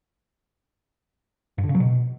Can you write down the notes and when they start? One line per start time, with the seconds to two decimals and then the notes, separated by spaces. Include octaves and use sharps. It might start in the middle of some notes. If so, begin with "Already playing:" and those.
1.58 G2
1.64 D3
1.69 C#3
1.75 F#3
1.80 B2